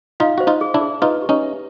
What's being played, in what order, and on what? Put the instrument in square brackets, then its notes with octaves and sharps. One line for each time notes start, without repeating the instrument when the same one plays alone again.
[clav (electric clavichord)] D#4 F4 [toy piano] F5
[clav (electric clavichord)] F#4 [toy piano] C5
[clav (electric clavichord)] D#4 F4
[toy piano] G#4
[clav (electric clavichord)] D4 E4
[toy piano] G#4
[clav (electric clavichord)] D#4 F4 [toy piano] B4
[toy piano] G4
[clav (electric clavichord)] C#4 D#4
[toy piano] E5